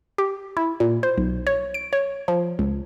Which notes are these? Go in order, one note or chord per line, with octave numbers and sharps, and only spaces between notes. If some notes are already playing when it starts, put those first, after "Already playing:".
G4
E4
A#2
C5
B1
C#5
D7
C#5
F3
C#2